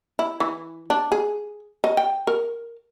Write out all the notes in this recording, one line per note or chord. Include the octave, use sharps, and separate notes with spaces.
E4
E3
D4
G#4
D#5
G5
A#4